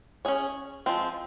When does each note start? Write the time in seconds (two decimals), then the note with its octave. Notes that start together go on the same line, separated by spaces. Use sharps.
0.25 C#4 G#4 C#5
0.86 F3 G#3 C4